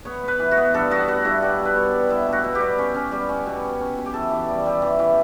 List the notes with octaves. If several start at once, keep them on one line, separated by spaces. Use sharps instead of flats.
B3 C#5
B3 B4
E3
F#4
B3
G2 A4
B3 F#4
B3 F#4
G2 E4
G3 F#4
B2
B4
B3 C#5
G3
B3 E4
B2
F#4
B2
G4
G3
C#4
C#4
G3
C#4
B2
C#4
C#4
B2
G4
E3 A4
E3
G3
G3
E3
E3